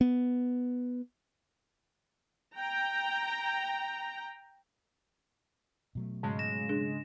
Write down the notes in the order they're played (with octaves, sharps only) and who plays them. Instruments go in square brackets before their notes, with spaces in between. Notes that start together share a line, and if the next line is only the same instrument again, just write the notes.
[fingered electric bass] B3
[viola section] G5 A#5
[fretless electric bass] B2 F#3 A3
[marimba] G#2 [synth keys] C#3 G#3
[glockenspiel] A#6 E7
[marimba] D4 G#4